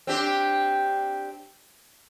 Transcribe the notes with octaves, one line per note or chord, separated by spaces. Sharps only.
C4 D4 G4